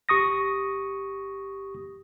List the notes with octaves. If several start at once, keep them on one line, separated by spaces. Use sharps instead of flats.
G1 G4 C#6 D#6 A#6